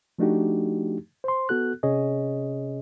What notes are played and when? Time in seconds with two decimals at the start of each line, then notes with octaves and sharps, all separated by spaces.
0.19 F3 A3 D4 D#4 F#4 G4
1.24 C5 C6
1.49 B3 F#4 A4 F#6
1.83 C3 C#4 G#4 C#5 D#5